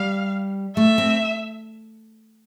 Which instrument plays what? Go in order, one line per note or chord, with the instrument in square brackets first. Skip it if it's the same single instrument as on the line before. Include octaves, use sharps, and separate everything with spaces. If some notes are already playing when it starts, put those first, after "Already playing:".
Already playing: [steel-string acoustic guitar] G3 [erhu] F5
[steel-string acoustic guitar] A3 [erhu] E5
[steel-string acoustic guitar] C4